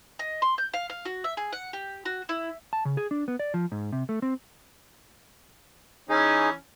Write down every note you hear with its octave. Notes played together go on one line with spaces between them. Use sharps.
D#5
C6
G6
F5
F5
F#4
E5
G#4
F#5
G4
F#4
E4
A5
C#3
G#4
D4
B3
D5
F3
G#2
C3
A3
C4
E3 C#4 D#4 G#4